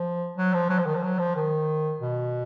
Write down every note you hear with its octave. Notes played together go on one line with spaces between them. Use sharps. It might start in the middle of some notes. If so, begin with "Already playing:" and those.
Already playing: F3
F#3
F3
F#3
F3
D#3
F3
F#3
F3
D#3
B2